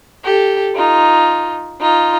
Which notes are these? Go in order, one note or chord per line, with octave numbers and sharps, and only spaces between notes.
G4 A4
D#4 F4
D#4 F4